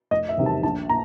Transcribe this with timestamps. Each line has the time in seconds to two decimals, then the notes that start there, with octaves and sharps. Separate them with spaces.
0.11 F1 D#5
0.29 E5
0.37 E2 C3 D#3 G3
0.46 A5
0.63 A#1 A5
0.89 A#2 A#5